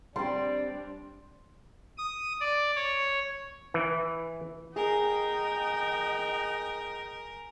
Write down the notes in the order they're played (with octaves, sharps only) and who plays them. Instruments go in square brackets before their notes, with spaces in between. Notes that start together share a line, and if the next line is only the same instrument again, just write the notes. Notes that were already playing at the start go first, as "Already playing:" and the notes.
[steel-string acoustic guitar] G3 C4 [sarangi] D4 [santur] G5 C6
[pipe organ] D#6
D5
C#5
[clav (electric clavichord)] E3
[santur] G#4 [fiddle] A#4 [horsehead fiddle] D#5 G5